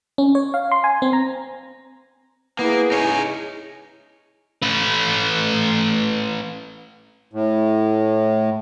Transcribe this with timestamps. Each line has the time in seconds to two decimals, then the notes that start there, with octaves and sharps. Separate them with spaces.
0.18 C#4
0.35 C#5
0.54 F5
0.72 C6
0.84 G#5
1.02 C4
1.13 A#5
2.59 A#3 B3 E4 G#4
2.92 C#4 D#4 C#5
4.62 A3 B4
7.33 A2